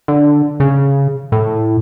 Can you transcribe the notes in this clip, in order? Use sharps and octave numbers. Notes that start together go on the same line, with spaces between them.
D3
C#3
A2